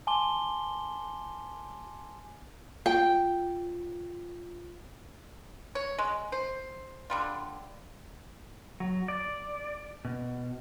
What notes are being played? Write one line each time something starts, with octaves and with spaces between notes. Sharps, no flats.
G#5 A5 C6 D6 G7
F4 G5
C#5
G#3
C5
D3 G3 F4
F#3
D5
B2